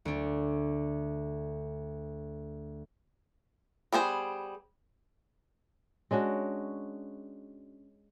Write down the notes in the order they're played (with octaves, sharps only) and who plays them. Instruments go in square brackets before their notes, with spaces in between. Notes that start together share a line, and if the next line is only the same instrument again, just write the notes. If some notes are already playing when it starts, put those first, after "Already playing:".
[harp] D2 D4
[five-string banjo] G3 B3 G#4 C5
[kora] G#3 C#4 D4 F#4